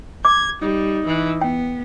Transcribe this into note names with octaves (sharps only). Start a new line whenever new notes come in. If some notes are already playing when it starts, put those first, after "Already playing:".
D6 G#6
G3 D#4
E3
B3 G5